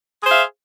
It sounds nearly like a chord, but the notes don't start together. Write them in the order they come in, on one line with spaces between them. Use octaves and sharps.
G#4 C5 F5 E5